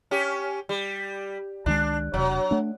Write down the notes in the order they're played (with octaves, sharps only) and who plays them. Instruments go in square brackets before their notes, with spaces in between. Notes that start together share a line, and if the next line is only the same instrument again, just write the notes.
[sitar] C#4 G4
G3
[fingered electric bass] C#2 D#3 G#3 [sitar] D4
[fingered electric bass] E1 C3 [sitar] F#3
[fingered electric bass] A3 D4